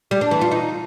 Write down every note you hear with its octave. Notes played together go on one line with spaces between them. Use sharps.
G3
D4
E3
F4
D#4